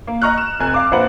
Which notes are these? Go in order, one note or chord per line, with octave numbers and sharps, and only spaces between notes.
A#3
D#5 A#5 C#6 F6 F#6
E7
F1 G#5 F#6
F5 D6
A#1 A#3 B4 C5 F#5 F#7